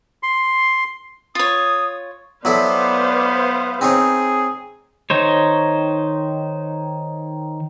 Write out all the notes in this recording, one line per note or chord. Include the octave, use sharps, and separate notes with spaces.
C6
F4 C#5 D#6
F#3 B3 E4 A4 B4 C5 D5 F5
C4 D#4 G#4 C#5
D#3 D#4 C5 C#5